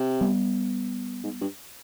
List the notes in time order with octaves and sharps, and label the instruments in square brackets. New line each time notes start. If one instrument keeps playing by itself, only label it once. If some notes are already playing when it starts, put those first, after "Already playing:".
Already playing: [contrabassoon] C3
[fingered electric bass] G3 B3
[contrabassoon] G#2
G2